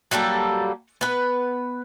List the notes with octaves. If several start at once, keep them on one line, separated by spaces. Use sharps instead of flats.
F#3 G3 A#3 A4
B3 B4